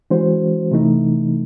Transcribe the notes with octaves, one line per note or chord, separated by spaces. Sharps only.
E3 G#3 C#4 F#4 C5
C3 E3 A3 D#4